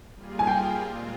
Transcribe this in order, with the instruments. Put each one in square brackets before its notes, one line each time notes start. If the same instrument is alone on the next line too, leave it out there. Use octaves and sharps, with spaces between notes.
[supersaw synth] G3 A#3 F4 G#4
[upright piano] G#5
G5
[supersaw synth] A#2 G#3 C4 F4